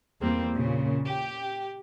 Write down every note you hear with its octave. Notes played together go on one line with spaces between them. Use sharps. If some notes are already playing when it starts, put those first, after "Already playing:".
E2 G3 A#3 C4
A#2 C#3
G4